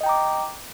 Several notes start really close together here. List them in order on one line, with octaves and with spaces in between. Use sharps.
D#5 G5 A#5 D6